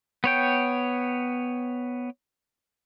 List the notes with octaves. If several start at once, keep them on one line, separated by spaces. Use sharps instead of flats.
B3 C#5 G5